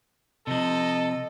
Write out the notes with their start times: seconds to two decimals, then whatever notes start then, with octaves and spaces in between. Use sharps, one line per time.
0.47 C3 F3 A4 D#5